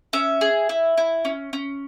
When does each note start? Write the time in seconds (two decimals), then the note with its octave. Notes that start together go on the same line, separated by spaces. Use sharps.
0.13 C#4 E5
0.41 G#4
0.69 E4
0.97 E4
1.25 C#4
1.53 C#4